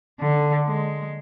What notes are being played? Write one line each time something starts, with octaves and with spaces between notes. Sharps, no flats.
D3
G#3